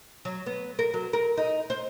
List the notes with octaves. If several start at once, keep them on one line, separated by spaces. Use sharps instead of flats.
F#3
B3
A#4
F#3
A#4
D#4
C5